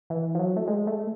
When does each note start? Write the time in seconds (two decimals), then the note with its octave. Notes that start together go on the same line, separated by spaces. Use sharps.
0.10 E3
0.35 F3
0.39 F#3
0.57 A3
0.68 G#3
0.87 A3